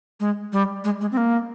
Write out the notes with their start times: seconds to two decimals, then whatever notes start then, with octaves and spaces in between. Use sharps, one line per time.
0.20 G#3
0.53 G3
0.84 G#3
1.01 G#3
1.12 C4
1.17 A#3